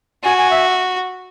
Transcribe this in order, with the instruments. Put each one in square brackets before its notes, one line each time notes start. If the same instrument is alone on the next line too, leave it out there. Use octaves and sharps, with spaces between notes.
[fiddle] F#4 [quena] G#5
[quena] G#5
E5